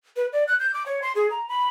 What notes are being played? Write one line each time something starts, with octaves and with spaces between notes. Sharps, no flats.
B4
D5
F#6
G6
D6
C#5
C6
G#4
A#5
B5